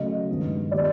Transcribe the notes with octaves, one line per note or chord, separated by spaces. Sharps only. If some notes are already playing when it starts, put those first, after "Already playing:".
Already playing: C#3 F#3 A3 D#5
G2 D#3 G#3 B3
D#3 G3 B3 D5